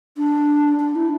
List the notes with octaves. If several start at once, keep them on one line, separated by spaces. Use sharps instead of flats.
D4
D4
E4